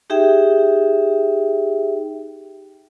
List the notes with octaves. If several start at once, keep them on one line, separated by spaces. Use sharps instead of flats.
D#4 G4 G#4 E5 G5